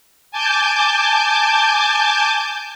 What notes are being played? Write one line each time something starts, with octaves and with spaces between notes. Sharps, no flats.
G#5 A5 D6 G6